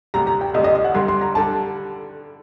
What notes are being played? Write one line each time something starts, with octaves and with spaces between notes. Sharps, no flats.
D2 C3 G3 A#5
A#5
G5
D2 C3 G3 D#5
D#5
D#5
F#5
G2 D3 G3 C6
C6
A#5
D3 G3 A5